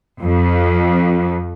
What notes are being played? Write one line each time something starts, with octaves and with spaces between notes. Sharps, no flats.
F2